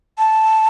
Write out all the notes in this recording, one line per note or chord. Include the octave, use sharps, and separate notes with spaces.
A5